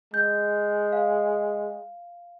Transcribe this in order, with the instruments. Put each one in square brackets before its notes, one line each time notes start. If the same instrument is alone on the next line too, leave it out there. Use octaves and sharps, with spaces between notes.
[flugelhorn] G#3 [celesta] G6
[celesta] F5